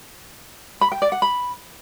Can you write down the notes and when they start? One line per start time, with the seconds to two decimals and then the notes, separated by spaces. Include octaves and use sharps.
0.81 B5
0.92 G5
1.02 D5
1.12 F#5
1.22 B5